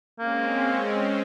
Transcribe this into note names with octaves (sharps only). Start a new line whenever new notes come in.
G#3 A#3 C4 C#4